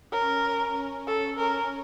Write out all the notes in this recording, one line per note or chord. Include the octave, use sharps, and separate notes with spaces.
C#4 A#4
C#4
C#4
A4
C#4 A#4